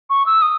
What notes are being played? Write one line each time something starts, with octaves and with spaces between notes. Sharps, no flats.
C#6
E6
D#6